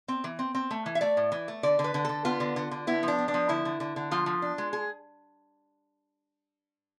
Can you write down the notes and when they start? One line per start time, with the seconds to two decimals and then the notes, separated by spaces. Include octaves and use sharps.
0.08 C4
0.24 E3
0.39 C4
0.55 C4
0.71 A3
0.86 E3
0.95 E5
1.01 A3 D5
1.17 A2
1.32 E3
1.48 A3
1.63 D3 D5
1.79 D3
1.84 B4
1.94 D3
2.05 D3 A4
2.25 B3 F4
2.40 D3
2.56 D3
2.71 D3
2.87 B3 E4
3.03 F3
3.08 D4
3.19 B3
3.28 D4
3.34 F3
3.49 D3 E4
3.65 D3
3.80 D3
3.96 D3
4.11 F3 F4
4.26 F3
4.42 D4
4.58 G#3
4.73 G#4